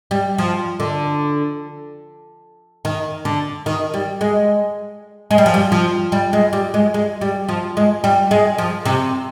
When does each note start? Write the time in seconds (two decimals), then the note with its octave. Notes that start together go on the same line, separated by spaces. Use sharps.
0.11 G3
0.38 F3
0.80 D3
2.85 D#3
3.25 D3
3.66 D#3
3.94 G3
4.21 G#3
5.31 G#3
5.38 G3
5.46 F3
5.54 G3
5.72 F3
6.12 G3
6.33 G#3
6.53 G3
6.74 G#3
6.94 G#3
7.21 G3
7.49 F3
7.77 G#3
8.04 G3
8.31 G#3
8.58 F3
8.85 C3